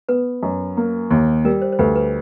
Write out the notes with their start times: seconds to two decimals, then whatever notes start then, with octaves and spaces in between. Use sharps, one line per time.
0.09 B3 B4
0.43 F#2
0.77 A#3
1.11 D#2
1.45 G3 A#4
1.62 C5
1.72 C5
1.79 D2 B4
1.96 B4